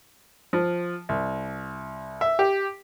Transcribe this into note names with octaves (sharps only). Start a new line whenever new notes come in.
F3
C2
E5
G4